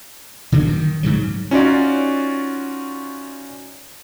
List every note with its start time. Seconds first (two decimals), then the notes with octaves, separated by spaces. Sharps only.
0.52 D3 E3 F#3 A#3
0.67 D#3
1.03 G#2 C#3 F#3
1.51 C#4 D#4 F4 F#4 D5